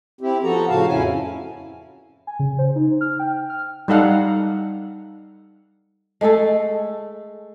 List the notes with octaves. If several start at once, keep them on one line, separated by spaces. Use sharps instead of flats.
C4 E4 G4
F3 B3 F#4 A4 A#5
A2 C#3 F3 F#4 F5 A5
F2 C#4 E4 G#5
G#5
C#3
C5
D#4
F6
G5
F6
G3 D#4 A4 F5 F#5
G#3 A3 G#4 A4